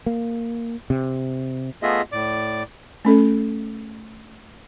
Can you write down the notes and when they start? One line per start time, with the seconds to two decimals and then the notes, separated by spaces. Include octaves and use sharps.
0.06 A#3
0.90 C3
1.83 A3 B3 F4 G#4 D#5 E5
2.12 A2 D5 D6
3.05 A3 C#4 A4